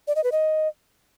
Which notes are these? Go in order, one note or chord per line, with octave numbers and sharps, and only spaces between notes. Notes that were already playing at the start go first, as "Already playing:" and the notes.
D5
D#5
B4
D#5